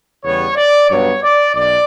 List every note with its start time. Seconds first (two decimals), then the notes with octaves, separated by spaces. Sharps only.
0.24 E2 C#3 G3 B3 C#5
0.56 D5
0.89 G2 F#3 B3 C#5
1.23 D5
1.54 B1 B2 D5